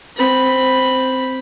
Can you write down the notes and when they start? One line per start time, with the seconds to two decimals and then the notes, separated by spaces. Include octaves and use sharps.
0.17 C4 B5